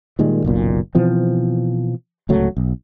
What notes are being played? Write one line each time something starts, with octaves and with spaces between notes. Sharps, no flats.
A#2 D#3 G3 G#3
F#1 B1 A#2
B2 E3 F3 C4
D1 C#2 F#3 A3
B1